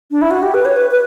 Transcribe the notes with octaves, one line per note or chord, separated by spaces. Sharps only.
D4
E4
F#4
G4
B4
C#5
B4
B4